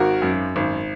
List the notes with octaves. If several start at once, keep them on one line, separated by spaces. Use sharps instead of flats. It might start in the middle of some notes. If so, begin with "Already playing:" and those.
Already playing: G#1 F#4 A#4
F#2
G#1